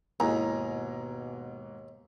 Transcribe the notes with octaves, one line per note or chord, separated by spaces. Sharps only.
D#2 G#2 B2 E4 F#4 G#4 G#5 A#5